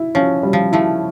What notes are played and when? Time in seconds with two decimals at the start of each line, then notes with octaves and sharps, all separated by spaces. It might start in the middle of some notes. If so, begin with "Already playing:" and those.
Already playing: E4
0.15 F3 C#4
0.43 G3
0.53 F3
0.72 F3 A3 E4